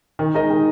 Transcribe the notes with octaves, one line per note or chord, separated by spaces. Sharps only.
D#3
G#3 D#4 A#4 D#5
D#3